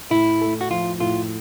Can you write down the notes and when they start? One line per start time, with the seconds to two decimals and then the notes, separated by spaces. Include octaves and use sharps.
0.10 A2 E4
0.41 A3
0.61 F#4
0.71 F3 F4
1.00 A2 F4